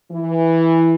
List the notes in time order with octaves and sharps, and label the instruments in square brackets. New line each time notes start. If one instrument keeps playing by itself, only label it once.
[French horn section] E3